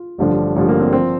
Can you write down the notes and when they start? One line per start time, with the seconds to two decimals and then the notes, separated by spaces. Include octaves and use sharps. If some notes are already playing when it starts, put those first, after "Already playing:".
Already playing: F4
0.18 A1 G2 D3 F3
0.56 A1 G2 D3 F3
0.69 A#3
0.80 C4
0.93 F3 C4